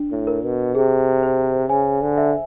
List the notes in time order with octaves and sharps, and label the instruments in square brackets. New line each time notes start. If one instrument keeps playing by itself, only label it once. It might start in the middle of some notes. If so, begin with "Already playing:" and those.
Already playing: [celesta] D4
[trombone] A2
[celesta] A#4
[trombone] B2
[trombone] C3 [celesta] G#4
[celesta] C5
[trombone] C#3 [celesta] G#5
[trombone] D3
[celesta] E5